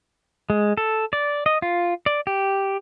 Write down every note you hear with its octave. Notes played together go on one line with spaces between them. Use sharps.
G#3
A4
D5
D#5
F4
D5
G4